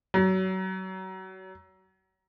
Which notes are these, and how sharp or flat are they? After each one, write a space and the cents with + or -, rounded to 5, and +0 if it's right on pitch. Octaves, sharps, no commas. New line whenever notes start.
F#3 +30